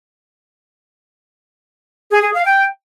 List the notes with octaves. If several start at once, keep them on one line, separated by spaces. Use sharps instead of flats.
G#4
G#4
F5
G5